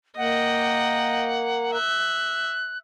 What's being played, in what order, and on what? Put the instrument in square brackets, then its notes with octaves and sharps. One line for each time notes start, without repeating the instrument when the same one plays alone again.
[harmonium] A#3 [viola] D#5 G5 [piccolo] F#5
[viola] E5 [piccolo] F#6